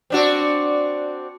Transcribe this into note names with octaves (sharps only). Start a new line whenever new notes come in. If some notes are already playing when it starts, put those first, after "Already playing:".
C4 D4 F#4